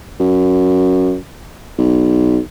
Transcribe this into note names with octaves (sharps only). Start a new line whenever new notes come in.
F#2
B1